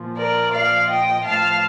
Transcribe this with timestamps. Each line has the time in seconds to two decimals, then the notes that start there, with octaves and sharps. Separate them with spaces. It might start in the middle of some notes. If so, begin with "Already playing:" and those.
Already playing: A#2 F3
0.17 A#4 D5
0.53 A#2 F3 D5 F5
0.89 D#5 G5
1.25 A2 F3 F5 A5